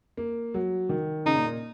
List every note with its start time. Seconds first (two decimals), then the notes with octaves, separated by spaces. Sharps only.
0.17 A#3
0.54 F#3
0.89 D#3
1.25 C#3 D#4
1.34 A#2
1.44 A#2